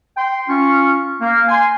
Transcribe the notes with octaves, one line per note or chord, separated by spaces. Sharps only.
G5 C6
C#4 F4 F5 C#6
A#3
G#5 C6